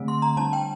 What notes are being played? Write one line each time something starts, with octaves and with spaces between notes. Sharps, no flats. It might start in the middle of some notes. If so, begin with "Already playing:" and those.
Already playing: D3 A3 C4
C6
A#5
G3 D4 A5
G5